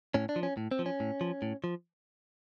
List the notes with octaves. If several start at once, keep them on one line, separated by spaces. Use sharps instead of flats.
A2 C#4
D4
F3
C#4
A2
C4
F3
C#4
A2
F3
A2
F3